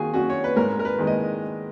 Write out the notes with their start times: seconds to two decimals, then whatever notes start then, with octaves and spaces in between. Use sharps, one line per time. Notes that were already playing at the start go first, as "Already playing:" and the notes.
Already playing: D#3 F4 F#4 G#4
0.14 F#3 C#4 F#4
0.30 C#5
0.44 B4
0.56 G#2 A#4
0.79 A#4
0.85 B4
0.99 D#3 G#3 B3
1.07 D#5